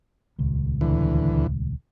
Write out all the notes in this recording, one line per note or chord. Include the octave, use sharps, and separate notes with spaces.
D#1 C#2
D2 E3